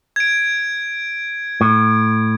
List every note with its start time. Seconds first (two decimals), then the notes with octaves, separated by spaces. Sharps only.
0.16 G#6 D7
1.61 A2